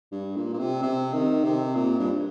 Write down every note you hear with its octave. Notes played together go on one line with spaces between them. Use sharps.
G2
A#2
A#2
C3
C3
D#3
C3
A#2
G2